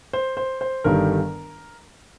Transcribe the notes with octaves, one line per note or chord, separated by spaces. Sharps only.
C5
C5
C5
G1 G2 D#3 G3 A#4